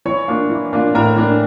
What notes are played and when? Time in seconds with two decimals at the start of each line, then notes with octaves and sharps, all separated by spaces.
0.05 E3 C#5 C#6
0.28 A#3 D4 F4
0.50 E3
0.73 A#3 D4 F4
0.95 A2 A#4 A#5
1.16 E3 A#3 D4